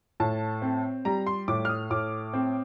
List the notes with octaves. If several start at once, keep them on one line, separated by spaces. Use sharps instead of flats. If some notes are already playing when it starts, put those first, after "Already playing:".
A2 A5
C4
G3 A#5
C6
A2 D6
F6
D#6
A2 D6
C4